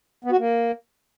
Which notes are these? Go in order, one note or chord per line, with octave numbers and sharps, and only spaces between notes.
B3
F#4
A#3